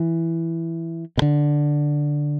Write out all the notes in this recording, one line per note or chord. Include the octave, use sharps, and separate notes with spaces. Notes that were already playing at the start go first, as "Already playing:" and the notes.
Already playing: E3
B2
D3